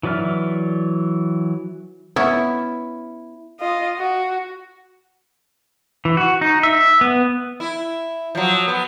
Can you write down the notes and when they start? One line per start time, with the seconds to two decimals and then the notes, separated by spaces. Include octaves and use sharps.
0.03 E3 F#3 D5 E5 F6
2.16 B3 C#4 E4
3.60 F4 D#5
3.98 F#4
6.05 E3
6.17 F#4
6.41 D#4
6.63 E5
7.01 B3
7.60 E4
8.35 F3 F#3
8.68 B3